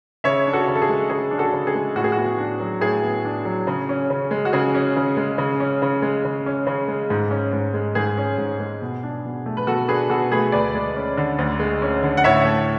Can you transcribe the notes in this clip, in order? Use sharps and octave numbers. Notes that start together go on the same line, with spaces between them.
C#3 C#5 E5
D4
F#4 A4
C#3
A4
G#4
G#3
C#3 G#4
D4
F#4 A4
C#3
G#4
G#3
A2 F#4
G#4
F#4
B3
D4
F#3
A2 G#4
B3
D4
F#3
C#3
C#4
C#3
G#3
F#4
C#3 G#4
C#4
C#3
G#3
C#3
C#4
C#3
G#3
C#3
C#4
C#3
G#3
G#2
C#4
G#2
G#3
G#2 G#4
C#4
G#2
G#3
B2
D4
B2
A3
B4
B2 F#4 A4
D4 G#4 B4
B2 F#4 A4
A3 G#4 B4
D2 B4 D5
G#3
C#4
D3
D2
G#3
C#4
D3
F#5
A2 C#5 E5
A3